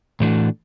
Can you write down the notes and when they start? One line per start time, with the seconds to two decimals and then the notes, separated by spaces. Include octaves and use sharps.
0.20 A2 E3 A3 D4 F#4